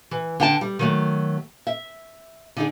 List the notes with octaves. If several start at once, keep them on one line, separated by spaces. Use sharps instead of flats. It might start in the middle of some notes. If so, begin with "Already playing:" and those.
E3
D3 G5 A5
G3
D#3 F#3 A3
E5
D3 D#4 G#4